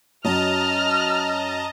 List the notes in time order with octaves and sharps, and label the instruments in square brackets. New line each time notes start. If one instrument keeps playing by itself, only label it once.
[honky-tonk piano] F#2 F#3 [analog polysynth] D#5 A5 A#5 [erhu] F6